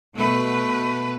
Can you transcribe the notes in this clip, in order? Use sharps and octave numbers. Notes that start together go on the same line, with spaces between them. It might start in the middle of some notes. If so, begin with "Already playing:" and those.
B2 A3 B4